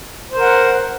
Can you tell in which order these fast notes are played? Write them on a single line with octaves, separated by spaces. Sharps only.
C5 A#4 F#5